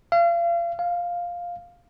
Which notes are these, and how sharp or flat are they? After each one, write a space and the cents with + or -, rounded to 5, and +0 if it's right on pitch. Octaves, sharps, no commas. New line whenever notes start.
F5 -35
F5 +5